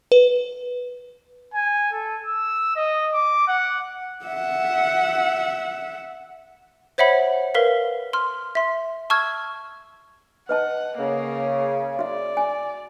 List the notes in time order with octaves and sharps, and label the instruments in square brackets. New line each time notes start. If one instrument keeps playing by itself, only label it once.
[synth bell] B4
[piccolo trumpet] G#5
A4
E6
D#5
D6
F#5
[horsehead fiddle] E5 F#5
[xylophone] C5 C#5 E5 F#5 B5
A#4 B4 F5 B6
C6 F6
E5 C6
A5 C#6 E6 F6 G#6
[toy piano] B4 D#5 A5 [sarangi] F#5
[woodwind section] C#3 [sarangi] A#3
[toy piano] F#4 E5 [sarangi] D5
[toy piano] G#5